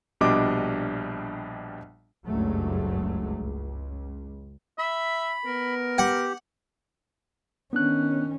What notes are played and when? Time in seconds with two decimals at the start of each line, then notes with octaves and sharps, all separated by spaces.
0.21 A#1 B2 G3 D4 D#5 D6
2.27 F#1 C#2 G2 F#3 G#3 A3
3.39 C#2
4.79 E5 B5
5.46 B3 A#4
5.98 G4 F#5
7.73 D#3 B3 C#4 D4 F#6